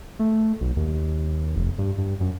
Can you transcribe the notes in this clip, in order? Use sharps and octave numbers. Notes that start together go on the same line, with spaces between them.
A3
B1
D#2
F1
G2
G2
F#2